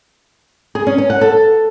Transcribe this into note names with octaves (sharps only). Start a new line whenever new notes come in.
G#4
C#4
C#4
F#5
A4